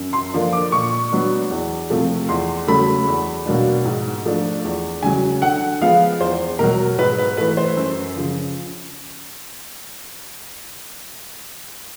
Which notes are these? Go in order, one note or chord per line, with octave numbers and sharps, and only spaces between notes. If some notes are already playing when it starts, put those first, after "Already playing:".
Already playing: F#2
C6
D3 F3 A#3 D4
D6
A#2 C#6
F#3 B3 D4
E2
C3 F3 A3 C4
E2 C6
C#3 F#3 A3 B5
E2
B2 F#3 A#3 D4
G#2
F3 A3 D4
E2
C#3 F#3 G#5
D3 F#5
F3 G#3 B3 F5
E2 C5
B2 F#3 A#4
G#2 B4
B4
E3 A3 B4
C5
F#2
C#3 F3